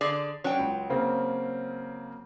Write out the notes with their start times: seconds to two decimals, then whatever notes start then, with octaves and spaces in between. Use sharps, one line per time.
0.01 D3 G#4 D5
0.44 F#3 C#4 D4 G5
0.59 C#2
0.90 C#3 A#3 C4